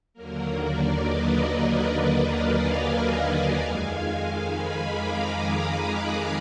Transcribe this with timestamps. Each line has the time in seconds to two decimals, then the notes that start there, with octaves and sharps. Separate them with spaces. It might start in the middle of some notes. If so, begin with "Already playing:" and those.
0.14 D#2 D3 F#3 A#3 A#4
0.57 A#4 D5
1.00 B4 D#5
1.44 B4 D#5
1.86 B4 D#5
2.15 D5 F5
2.44 F5 G#5
3.59 F2 D#3 G#3
4.45 G#5 B5
4.88 A#5 D6
5.31 B5 D#6
5.74 D#6 F#6